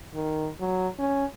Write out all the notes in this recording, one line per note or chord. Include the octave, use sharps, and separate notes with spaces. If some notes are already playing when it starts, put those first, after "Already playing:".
D#3
F#3
C#4